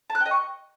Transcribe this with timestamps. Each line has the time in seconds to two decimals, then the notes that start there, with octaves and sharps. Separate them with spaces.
0.10 A5
0.15 F#6
0.20 G5
0.26 D#5
0.31 C#6